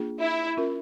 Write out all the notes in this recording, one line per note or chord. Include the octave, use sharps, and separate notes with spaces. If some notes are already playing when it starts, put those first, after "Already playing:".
Already playing: A#3 D4 F4 G#4
E4
C#4 F4 A#4